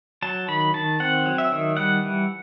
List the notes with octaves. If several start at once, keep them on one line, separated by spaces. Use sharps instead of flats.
F#3 A5
D#3 B5
D#3 A5
C4 F#5
F#3
E5
D#3
G3 F#5
E3